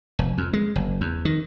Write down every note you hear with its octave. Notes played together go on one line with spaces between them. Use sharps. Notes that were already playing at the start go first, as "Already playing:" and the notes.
F1
F2
G#3
F#1
E2
D#3